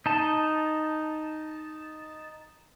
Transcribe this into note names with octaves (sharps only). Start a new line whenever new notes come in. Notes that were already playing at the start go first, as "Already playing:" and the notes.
D#4 A5